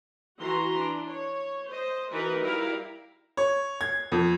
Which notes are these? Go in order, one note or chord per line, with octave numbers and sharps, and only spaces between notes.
E3 F#4 A#5 C6
D4
C#5
C5 D#5
E3 D#4 F#4 A#4 B4
G3 E4 A#4 F5
C#5
G#6
F2